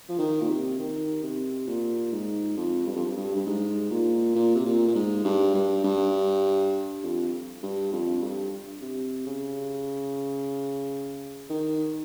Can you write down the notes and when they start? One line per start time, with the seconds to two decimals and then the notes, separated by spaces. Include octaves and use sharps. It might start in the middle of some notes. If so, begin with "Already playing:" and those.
0.09 F3
0.19 D#3
0.41 A#2
0.49 C3
0.79 D#3
1.23 C3
1.67 A#2
2.12 G#2
2.57 F2
2.87 G2
2.96 F2
3.05 G2
3.16 G2
3.36 G2
3.46 G#2
3.91 A#2
4.35 A#2
4.55 C3
4.65 A#2
4.87 A#2
4.95 G#2
5.25 G2
5.54 G2
5.84 G2
7.03 F2
7.63 G2
7.92 F2
8.22 G2
8.81 C3
9.26 C#3
11.50 D#3